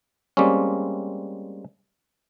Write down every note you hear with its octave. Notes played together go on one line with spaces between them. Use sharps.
G3 G#3 A#3 C4 C#4